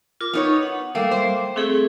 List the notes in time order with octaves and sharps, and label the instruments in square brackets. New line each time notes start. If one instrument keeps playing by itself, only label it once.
[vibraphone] F4 A#4 D6
[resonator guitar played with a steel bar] B3 D#4 C#5
[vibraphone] F#5
[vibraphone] G3 D6 [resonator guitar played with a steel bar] A3 [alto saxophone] A#3
[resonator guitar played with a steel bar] C5
[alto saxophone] A3 [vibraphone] C4 G#4 A4